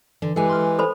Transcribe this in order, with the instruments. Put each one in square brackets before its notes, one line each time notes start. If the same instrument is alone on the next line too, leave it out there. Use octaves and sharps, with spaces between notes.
[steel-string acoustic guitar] D3 [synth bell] E3
[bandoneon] E3 [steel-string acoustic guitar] G#3 G4 [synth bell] A4 G#5
[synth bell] C6 F6
[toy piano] A4 C5 B5